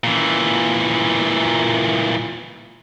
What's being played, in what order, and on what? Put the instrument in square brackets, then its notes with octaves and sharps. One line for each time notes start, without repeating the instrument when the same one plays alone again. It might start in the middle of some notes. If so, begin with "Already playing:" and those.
[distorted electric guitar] A#2 E3